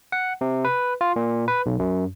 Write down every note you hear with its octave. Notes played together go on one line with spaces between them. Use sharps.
F#5
C3
B4
F4
A#2
B4
B1
F#2